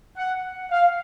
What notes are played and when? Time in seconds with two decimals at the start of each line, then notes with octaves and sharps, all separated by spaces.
0.17 F#5
0.70 F5